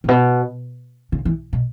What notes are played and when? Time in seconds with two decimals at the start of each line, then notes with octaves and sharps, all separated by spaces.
0.04 A2
0.08 B2
1.12 C#3
1.25 E3
1.53 B2